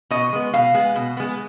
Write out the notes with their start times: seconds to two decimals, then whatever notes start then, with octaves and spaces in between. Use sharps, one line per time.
0.11 B2 D#5
0.33 G#3 B3
0.54 B2 F5
0.74 G#3 B3
0.96 B2
1.17 G#3 B3